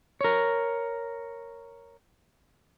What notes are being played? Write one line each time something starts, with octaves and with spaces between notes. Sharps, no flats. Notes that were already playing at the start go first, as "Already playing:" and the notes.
A#4 C#5